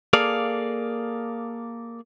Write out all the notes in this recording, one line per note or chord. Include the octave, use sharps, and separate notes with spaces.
A#3 G#4 A4 D5 F5